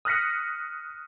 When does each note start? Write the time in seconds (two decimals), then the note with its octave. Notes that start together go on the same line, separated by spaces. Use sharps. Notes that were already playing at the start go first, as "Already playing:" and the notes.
0.05 D#6 F6 F#6 A#6 B6 C#7